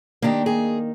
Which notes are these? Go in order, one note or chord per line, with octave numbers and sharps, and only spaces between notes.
D#3 A#3 D4 G4
G#4